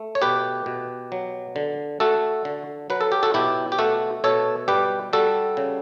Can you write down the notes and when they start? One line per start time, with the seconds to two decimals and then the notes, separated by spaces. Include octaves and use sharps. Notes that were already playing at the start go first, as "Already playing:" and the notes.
Already playing: A3
0.15 C#5
0.22 B2 G4 B4
0.66 B2
1.12 F#3
1.56 D3
2.00 A3 F#4 A4
2.45 D3
2.90 F#3 B4
3.01 A4
3.12 G4
3.23 F#4 A4
3.34 B2 E4 G4
3.72 G4
3.78 A3 F#4 A4
4.24 B2 A4 C#5
4.68 G3 G4 B4
5.13 G3 F#4 A4
5.57 C#3